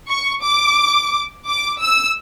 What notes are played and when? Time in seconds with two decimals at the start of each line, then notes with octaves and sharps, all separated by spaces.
0.08 C#6
0.43 D6
1.47 D6
1.81 E6